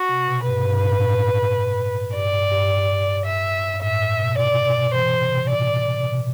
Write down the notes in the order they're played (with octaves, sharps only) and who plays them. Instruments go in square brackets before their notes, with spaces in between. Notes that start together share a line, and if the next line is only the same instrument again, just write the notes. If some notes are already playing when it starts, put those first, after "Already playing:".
Already playing: [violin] F#4
[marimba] C3
B2
[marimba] G2 [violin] B4
[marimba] G2
A2
A2
[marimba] G2 [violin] D5
[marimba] G2
G2
[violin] E5
[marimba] G2
[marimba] A2 [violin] E5
[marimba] A2
B2
[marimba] C3 [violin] D5
[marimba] B2
[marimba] E3 [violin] C5
[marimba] C3
B2
[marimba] A2 [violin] D5
[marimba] B2
C3
B2